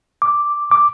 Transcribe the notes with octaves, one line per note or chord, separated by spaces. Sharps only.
D6
D6